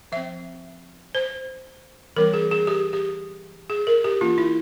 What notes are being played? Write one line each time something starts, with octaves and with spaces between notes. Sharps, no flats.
F3 C4 E5
C5
E3 G3 C4 A#4
G#4
G#4
G4
G4
G#4
A#4
G4
E3 A#3 C#4 F4
E4